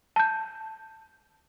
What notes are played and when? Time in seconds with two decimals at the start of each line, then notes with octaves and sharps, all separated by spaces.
0.16 A5 G6